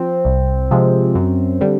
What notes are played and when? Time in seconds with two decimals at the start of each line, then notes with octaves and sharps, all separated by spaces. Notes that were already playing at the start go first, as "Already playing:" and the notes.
Already playing: F3 C4
0.25 C2
0.71 C3 F3 G#3
1.15 F#2
1.61 D3 G3